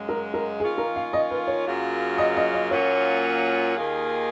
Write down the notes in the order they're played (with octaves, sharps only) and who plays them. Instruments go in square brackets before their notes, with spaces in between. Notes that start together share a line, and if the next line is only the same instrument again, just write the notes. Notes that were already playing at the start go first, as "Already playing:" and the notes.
Already playing: [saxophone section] F#2 C#3 G#3
[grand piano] A#4
A#4
[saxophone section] D#3 A#3 C#4 F4 [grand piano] G#4
[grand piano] A#4
F5
D#5
B4
C#5
[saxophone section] F#2 C#3 F#3 A#3 F4
[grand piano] D#5
D#5
D#5
[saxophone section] A#2 F#3 A#3 C#4 F4 [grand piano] C#5
[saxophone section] D#2 D#3 A#3 F4 G#4